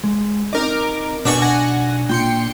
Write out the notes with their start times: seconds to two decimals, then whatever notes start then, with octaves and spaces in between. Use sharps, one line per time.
0.04 G#3
0.53 C4 D#4 A#4 D#5 D6
1.25 B2 D4 F#4 D5 D#5 G#5 C#6
1.42 B1 F#5 G#5 A#6
2.09 A#2 A#3 F4 G5 C6 C#7